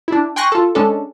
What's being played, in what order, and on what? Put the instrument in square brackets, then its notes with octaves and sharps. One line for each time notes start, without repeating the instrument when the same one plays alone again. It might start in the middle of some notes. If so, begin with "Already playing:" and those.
[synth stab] D4 E4
G5 G#5 C6 C#6 F#6 A#6
F4 A4
G#3 C#4 D4 A4